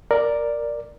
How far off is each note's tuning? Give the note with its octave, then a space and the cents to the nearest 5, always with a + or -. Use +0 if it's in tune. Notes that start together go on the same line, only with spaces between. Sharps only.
A#4 +0 D5 +0